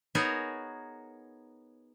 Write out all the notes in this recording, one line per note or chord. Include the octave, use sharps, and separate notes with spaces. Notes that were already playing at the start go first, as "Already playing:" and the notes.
B3 D#4 F#4 G#4 A#4 C#5